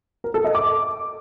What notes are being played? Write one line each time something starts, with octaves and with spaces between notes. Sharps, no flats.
A#4
A4
D#5
D6